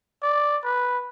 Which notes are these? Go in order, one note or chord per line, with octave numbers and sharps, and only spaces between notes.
D5
B4